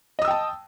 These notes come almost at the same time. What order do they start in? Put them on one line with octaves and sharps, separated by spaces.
D#5 D#6 E6 G5 A5